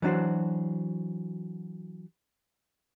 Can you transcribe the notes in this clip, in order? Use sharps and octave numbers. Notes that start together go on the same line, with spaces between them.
E3 F#3 D4 F#4 C5